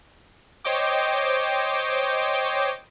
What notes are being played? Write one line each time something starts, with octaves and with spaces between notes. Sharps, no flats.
C5 C#5 D#5 G5 D6